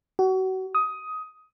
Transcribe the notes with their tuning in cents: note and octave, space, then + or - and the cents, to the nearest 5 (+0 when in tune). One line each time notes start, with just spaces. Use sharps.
F#4 +30
D#6 +15